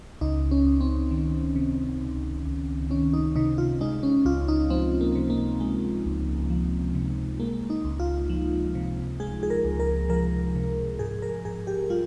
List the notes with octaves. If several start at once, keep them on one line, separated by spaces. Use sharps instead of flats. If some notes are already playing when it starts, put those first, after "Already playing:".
C#2 D#4
C#4
C#2
C4
D#3
C3
C#2
C#2
D#3 C#4
D#4
C3 D#4
F4
G#3 D#4
C#4
C#2 F4
D#4
F3 C4
A#3
C3
A#3
G#3
C#2
F3
C3
G#3 A#3
D#4
C#2
F4
F3
C3
G#3 G#4
G#4
A#4
C#2
A#4
F3 A#4
C3
G#2 G#4
A#4
G#2 G#4
G4
G3 F4